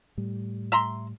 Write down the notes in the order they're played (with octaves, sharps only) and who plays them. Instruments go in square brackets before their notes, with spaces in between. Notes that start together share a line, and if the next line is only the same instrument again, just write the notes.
[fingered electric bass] A2 G3
[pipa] E5 A#5 C6